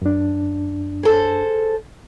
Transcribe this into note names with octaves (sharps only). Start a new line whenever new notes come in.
F#2 D4
G#4 A4 C5